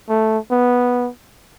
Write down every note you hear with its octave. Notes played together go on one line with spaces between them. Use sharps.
A3
B3